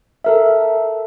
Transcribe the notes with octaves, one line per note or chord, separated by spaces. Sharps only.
A4 A#4 E5